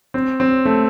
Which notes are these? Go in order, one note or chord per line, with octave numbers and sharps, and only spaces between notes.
C4
C4
A3